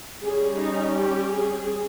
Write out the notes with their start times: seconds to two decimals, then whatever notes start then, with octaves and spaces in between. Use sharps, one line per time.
0.24 G3 C#4 G#4
0.61 D#4
0.96 G4
1.33 G#4